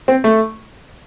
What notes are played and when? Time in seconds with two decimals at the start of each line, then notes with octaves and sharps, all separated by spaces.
0.08 C4
0.24 A3